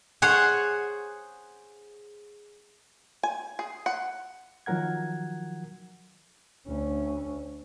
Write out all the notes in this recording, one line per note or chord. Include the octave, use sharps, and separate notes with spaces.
G#4 C5 C#5 F#5
G#5
G#4
F#5
D#3 F3 F#3 A#4 F#5 G#6
D2 C#4